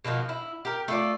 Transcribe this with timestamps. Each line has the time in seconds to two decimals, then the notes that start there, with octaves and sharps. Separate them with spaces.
0.04 B2 D#3 F3 A#3
0.29 E4
0.65 G4 A#4
0.88 A3 F4 D5